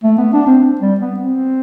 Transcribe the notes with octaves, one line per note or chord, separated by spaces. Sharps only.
A3
B3
D4
C4
G3
B3
C4